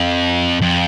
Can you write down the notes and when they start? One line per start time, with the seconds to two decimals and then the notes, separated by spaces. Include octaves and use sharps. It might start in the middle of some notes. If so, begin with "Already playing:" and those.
Already playing: F2
0.61 F2